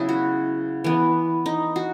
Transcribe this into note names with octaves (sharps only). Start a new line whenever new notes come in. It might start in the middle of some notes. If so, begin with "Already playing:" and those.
Already playing: C#3 F#3 B3 E4 G#4
F#4
E3 B3
D#4
F#4